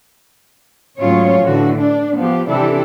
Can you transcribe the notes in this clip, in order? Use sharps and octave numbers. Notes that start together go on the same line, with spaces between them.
D2 G#2 F#3 C#4 F4 C#5
A2 D3 E3 F#4
D4
F3 B3 G4
C3 E3 D4 E4 G4 A4